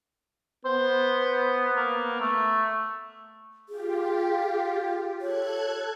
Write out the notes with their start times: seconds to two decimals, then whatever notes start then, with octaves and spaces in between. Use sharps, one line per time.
0.65 B3 C5
1.76 A#3
2.20 A3
3.69 F4 G4 G#4
5.21 A4 C#5 F#6 G#6